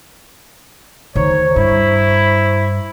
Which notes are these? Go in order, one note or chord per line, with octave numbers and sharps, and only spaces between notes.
D2 D#3 C5 C#5 A#5 C#6
G2 E4